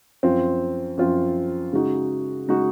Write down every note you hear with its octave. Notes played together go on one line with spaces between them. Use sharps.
F#2 F3 C4 F4
F#2 F3 C4 F4
C#3 G#3 D#4 F#4
C#3 G#3 D#4 F#4